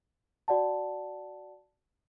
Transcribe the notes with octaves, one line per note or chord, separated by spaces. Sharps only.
F#4 D5 F#5 A5